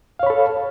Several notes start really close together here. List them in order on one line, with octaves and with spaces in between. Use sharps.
F5 C#5 B5 A4